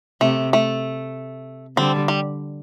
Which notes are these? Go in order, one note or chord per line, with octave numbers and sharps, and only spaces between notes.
C3 A3
A3
D3 G3 C4
G3